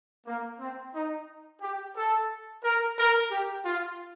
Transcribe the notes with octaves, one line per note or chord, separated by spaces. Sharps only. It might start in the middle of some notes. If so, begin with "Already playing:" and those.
A#3
C4
D#4
G4
A4
A#4
A#4
G4
F4